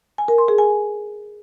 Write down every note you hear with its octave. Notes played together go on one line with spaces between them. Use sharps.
G#5
A#4
C6
G#4
G#5